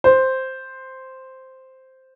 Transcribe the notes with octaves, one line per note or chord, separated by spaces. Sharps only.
C5